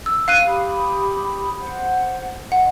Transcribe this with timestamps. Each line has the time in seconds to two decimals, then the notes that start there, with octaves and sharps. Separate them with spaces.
0.06 E6
0.28 F5 F#6 D#7
0.47 G4 B5 D#6
1.59 C5 F#5
2.52 D#5 F#5